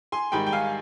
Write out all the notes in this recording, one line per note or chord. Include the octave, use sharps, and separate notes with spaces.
G#5 C6
G#2 D#3 G3 G5 B5
G5
F5 G#5